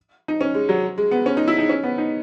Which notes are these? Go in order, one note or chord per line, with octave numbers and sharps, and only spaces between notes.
D#4
C#4
G#3
F#3
G#3
B3
C#4
D#4
E4
D#4
C#4
B3
D#4